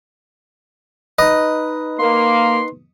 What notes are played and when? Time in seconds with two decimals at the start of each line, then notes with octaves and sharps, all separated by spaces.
1.19 D#4 B4 D#5
1.99 A#3 C6